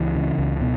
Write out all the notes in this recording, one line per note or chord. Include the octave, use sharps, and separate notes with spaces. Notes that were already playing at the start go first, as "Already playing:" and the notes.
Already playing: C#2 E3
C#3
C#2
B2